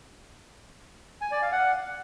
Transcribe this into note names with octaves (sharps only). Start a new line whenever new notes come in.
G#5
D5
F5
F#5